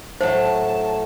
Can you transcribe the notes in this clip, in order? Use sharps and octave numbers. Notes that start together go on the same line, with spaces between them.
A2 F#3 C5 A5